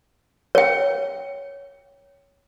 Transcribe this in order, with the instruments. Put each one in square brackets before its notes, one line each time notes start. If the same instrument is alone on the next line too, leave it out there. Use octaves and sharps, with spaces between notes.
[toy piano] C#5 G5